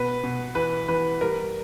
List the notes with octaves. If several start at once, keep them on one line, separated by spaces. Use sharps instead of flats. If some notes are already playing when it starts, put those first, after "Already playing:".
Already playing: B2 B4
B2
E3 B4
E3 B4
G3 A#4